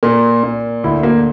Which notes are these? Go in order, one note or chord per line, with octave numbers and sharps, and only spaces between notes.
A#2 A#4
A#2
D2 E4
A#3